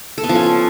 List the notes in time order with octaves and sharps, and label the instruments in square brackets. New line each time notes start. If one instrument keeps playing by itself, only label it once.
[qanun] A4
B3
F3
C#4